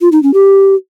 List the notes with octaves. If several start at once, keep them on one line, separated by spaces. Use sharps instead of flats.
F4
D#4
C#4
G4